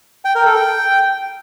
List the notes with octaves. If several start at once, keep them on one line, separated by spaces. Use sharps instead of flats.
G5
A#4
A4
G5